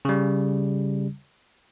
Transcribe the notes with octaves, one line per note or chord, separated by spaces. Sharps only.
C#3 G3